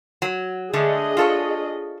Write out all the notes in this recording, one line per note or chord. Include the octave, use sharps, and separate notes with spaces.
F#3
D3 G#3 A3 D4 G#4 D#5
F4 A4 C#5